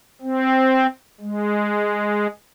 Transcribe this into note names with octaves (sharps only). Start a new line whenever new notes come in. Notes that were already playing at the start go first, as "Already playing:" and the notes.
C4
G#3